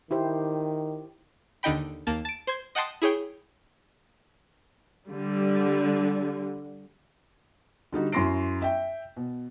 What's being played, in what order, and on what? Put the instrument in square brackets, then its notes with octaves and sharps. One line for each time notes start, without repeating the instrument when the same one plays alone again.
[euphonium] D#3 [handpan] E4 G4 C5
[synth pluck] D#2 D3 D#4 D#5 G5 B5
D#2 A#3 A5
A5 D7
C5 C6 G#6
D#5 F#5 G5 A5 C6 D#6
E4 G#4 C#5 G5
[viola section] D3 G3
[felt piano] D3 G3 D#4 F#4
F#2 E4 C6 A#6 C7 D7
E5 G5
B2